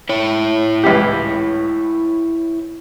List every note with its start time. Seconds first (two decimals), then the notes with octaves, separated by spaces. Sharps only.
0.09 E4 C#5
0.83 C#2 E3 G4